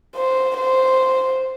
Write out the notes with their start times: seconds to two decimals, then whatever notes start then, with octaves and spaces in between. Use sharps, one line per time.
0.16 C5
0.57 C5